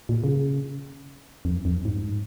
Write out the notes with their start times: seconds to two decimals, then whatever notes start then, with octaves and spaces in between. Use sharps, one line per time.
0.09 A#2
0.24 C#3
1.45 F2
1.65 F2
1.85 G#2